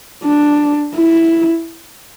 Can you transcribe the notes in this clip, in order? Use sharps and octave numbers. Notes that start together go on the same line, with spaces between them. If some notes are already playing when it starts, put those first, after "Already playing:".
D4
E4